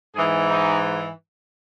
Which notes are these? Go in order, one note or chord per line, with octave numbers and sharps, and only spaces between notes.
G#2 E3 G#4
D#4